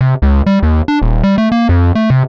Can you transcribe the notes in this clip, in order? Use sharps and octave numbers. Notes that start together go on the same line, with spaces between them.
C3
C#2
G3
D#2
D4
D#1
G3
A3
A#3
F2
A3
C3